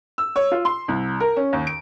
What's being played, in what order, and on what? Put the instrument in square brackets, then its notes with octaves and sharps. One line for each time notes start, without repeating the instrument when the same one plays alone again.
[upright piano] E6
C#5
F4
C6
C2
A#4
C#4
D#2
D7